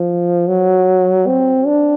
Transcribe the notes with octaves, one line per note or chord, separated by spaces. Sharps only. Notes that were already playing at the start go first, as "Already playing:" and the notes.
Already playing: F3
F#3
C4
D4